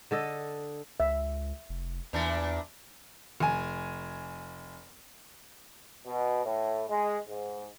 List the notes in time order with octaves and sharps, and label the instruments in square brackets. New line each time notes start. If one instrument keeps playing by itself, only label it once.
[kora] D3 A4 D#5
[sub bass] C#2 [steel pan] E5
[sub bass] F1
[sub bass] E2 [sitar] A#2 E3 D4
[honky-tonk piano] F1 G#5
[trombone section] B2
A2
G#3
G#2